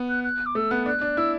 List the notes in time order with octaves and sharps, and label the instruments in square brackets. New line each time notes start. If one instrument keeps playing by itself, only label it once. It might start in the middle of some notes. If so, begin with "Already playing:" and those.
Already playing: [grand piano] B3
[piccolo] F#6
F#6
D6
[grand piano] A3 [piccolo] E6
[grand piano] B3 [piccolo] F#6
[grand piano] D4 [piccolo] F#6
[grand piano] D4
[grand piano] E4 [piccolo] E6